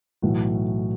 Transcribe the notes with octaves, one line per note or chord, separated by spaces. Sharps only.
B1 A2 E3 F#4